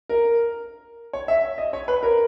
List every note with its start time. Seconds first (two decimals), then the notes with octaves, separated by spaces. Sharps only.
0.09 A#4
1.13 C#5
1.28 E5
1.58 D#5
1.73 C#5
1.88 B4
2.03 A#4